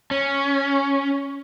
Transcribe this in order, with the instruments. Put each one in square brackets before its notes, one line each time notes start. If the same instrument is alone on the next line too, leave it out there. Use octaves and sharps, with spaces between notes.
[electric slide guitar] C#4